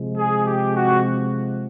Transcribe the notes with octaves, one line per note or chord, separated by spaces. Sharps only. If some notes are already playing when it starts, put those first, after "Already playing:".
Already playing: C3 F3 G#3
G#4
G4
F#4